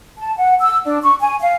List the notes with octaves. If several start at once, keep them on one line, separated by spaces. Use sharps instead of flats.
A5
F#5
E6
D4
C#6
G#5
F5